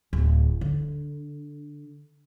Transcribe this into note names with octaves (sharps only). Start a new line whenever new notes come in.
D1
D3